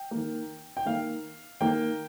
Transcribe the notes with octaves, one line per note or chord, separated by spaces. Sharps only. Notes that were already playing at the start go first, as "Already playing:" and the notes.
Already playing: G5
D#3 A#3
G5
D#3 A#3 F5
D#3 A#3 G5